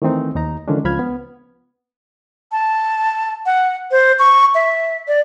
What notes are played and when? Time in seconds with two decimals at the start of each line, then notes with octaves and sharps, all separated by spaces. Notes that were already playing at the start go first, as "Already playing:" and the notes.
0.02 D#3 E3 A3 C4 D#4
0.35 D#2 D#4 A#5
0.68 D3 D#3 F3 G#3 C#4 D4
0.85 C#2 F3 B5 F6 G#6
0.99 B3
2.52 A5
3.46 F#5
3.91 C5
4.19 C#6
4.55 E5
5.08 D5